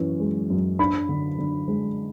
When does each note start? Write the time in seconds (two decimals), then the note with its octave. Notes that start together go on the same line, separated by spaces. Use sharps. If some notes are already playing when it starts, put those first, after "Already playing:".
Already playing: F#2 E3 C#4
0.20 G#3
0.50 F#2
0.79 D4 B5
1.09 D3
1.38 D3
1.68 G#3